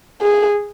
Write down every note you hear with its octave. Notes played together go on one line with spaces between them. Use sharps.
G#4